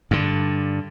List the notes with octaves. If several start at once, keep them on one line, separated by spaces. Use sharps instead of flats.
G2 D3